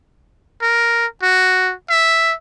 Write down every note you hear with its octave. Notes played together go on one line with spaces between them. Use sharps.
A#4
F#4
E5